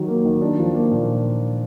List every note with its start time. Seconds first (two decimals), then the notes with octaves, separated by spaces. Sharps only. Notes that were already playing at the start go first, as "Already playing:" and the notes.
Already playing: D#3 F#3
0.08 A#3
0.25 D#3
0.42 D4
0.58 F3
0.75 A#3
0.91 A#2